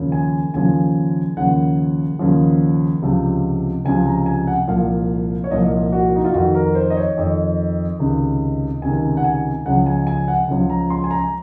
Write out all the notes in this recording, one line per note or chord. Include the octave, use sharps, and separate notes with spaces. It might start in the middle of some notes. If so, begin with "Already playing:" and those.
Already playing: D#2 C#3 F3
G#5
D#2 C#3 F3 G#5
D#2 C#3 F3 F#5
D#2 C#3 F3
C#2 C3 F3
C#2 C3 F3 G#5
A#5
G#5
F#5
C2 A#2 F3 F5
C#5
C2 A#2 F3 D#5
F#4
D#4
F4
F2 D#3 F#4
A#4
C5
D#5
C#5
F2 D#3 D#5
C#2 C3 D#3
C#2 C3 D#3 G#5
F#5
G#5
C#2 C#3 F3 F#5
G#5
G#5
F#5
C#2 C#3 F3
A#5
C6
G#5
A#5